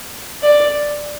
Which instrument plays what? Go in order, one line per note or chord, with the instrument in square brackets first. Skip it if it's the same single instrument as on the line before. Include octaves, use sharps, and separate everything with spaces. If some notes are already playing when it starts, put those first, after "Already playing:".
[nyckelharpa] D5